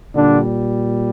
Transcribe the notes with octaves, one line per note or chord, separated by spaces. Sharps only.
A#2 D3 G3 D4